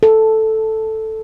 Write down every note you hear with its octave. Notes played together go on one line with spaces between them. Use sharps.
A4